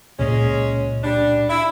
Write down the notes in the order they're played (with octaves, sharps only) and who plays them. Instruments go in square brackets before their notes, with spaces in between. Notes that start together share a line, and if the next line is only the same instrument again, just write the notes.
[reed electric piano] C#2 A#2 [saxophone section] G#3 C#4
[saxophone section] G3 D4
E4